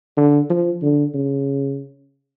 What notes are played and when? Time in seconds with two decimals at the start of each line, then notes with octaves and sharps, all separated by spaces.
0.17 D3
0.50 F3
0.82 D3
1.14 C#3